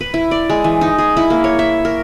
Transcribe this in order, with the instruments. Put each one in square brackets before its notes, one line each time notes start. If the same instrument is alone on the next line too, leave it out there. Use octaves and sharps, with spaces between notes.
[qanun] B4
E4
D5
G#3
E3
D#4
G#4
E4
A#3
C#5
E5
A#4